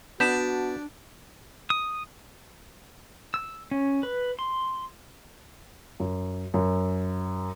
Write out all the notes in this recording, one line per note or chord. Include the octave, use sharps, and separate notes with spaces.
B3 D4 F#4 G6 B6 E7
D#6
E6
C#4
B4
C6
F#2
F#2